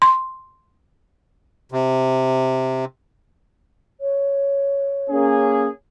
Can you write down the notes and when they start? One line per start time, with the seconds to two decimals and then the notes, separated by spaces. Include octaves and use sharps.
0.02 C6
1.72 C3
4.00 C#5
5.10 A#3 C#4 G#4